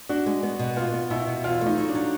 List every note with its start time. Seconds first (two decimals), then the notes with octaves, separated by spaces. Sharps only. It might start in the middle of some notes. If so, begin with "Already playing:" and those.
0.09 D4 F#4
0.26 G#3
0.43 B3
0.59 B2
0.77 B3 F4
0.93 B3
1.10 B2 E4
1.27 B2
1.44 E2 F4
1.61 A3
1.66 D#4
1.78 F#3
1.89 D4
1.95 F#3